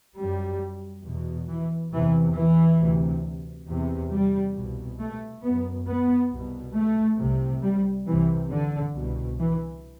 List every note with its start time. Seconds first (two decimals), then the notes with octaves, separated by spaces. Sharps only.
0.18 F#2 G3
1.05 E2 B2
1.49 E3
1.93 E2 C3 E3
2.37 E3
2.81 D2 C3
3.69 E2 C3
4.13 G3
4.56 C2 B2
5.00 A3
5.44 F#2 B3
5.88 B3
6.31 C2 B2
6.76 A3
7.20 C2 C3
7.63 G3
8.07 C2 C3 E3
8.51 D3
8.95 C2 B2
9.39 E3